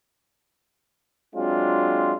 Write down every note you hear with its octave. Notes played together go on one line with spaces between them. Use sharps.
F#3 G#3 C4 D4 F4